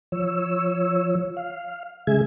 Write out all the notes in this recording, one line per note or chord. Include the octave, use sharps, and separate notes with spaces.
F3 C#5 E6
F5
C#3 G#3 G#4 E5 G#6